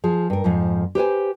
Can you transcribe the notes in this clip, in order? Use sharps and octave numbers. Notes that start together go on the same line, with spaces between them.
F3 G#4
G2 A#4
F2 G#2 F3
G4 B4 C5 G#5